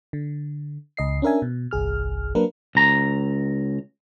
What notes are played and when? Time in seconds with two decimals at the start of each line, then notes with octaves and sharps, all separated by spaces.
0.13 D3
0.97 C#2 D#5 C7
1.22 C#4 D4 A#4 E5 G#5
1.42 B2
1.71 G1 C2 G#4 F6
2.35 F#3 A#3 D4 A#4 B4
2.75 C#2 A#5